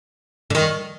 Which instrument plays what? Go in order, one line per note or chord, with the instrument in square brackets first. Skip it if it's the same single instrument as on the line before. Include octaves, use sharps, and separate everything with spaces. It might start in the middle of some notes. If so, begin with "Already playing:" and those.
[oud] D3
D#3